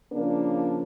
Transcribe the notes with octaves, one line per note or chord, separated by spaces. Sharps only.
C#3 F3 A#3 D4